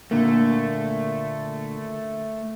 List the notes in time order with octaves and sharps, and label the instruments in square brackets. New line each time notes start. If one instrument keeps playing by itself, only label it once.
[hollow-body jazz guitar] A#2 D3 A#3 [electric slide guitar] A3